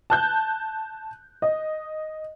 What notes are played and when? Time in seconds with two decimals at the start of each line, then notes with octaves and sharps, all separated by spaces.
0.10 A5 F#6 G6
1.42 D#5